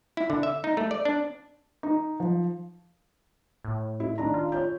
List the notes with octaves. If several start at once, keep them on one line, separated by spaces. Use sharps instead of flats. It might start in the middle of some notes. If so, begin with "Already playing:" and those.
E4
D3
E5
D#4
A3
D5
D4
D#4
F3
A2
E4
D#3 D4 A#5
F4
C#5 G6